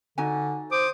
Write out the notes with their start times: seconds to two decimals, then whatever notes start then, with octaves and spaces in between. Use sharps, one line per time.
0.18 D3 D#4 F#4 G#5
0.72 C5 D6 D#6